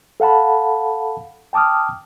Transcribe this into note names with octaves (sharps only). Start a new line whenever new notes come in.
A4 F5 F#5 A5 B5
G5 A5 D6 D#6 F6